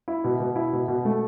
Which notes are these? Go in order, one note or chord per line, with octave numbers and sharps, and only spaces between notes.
E4
B2
B2
E4
B2
B2
A3